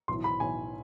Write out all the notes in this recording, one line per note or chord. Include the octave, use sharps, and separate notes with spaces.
B1 A2 E3 C6
B5
B1 A2 E3 G#5